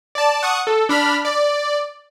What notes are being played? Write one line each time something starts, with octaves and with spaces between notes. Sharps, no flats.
D5 A5
F#5 C#6 D#6
A4
D4 B5 F6
D5